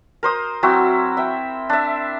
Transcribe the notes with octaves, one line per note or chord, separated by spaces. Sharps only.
A#4 C5 D#6
F#3 C4 E4 F#4
E5 G5
D4 E5